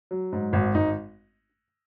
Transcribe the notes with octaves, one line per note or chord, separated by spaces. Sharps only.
F#3
G#2
G#1
G#1 D#4